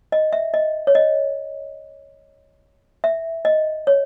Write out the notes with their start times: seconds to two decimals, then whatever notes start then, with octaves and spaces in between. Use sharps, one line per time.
0.12 D#5
0.33 E5
0.54 D#5
0.87 C#5
0.95 D#5
3.04 E5
3.45 D#5
3.87 C#5